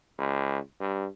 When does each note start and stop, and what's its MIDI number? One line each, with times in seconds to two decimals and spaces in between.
0.19 0.58 37
0.80 1.07 43